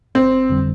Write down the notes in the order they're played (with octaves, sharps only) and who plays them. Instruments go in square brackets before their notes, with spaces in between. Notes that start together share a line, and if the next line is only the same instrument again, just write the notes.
[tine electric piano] G1 [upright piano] C4
[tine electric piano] F2 D3 G3